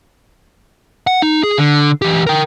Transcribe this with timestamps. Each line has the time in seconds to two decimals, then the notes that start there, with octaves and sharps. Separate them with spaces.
1.07 F#5
1.22 D#4
1.43 G#4
1.58 D3
2.02 E3 G4
2.27 A#4 G5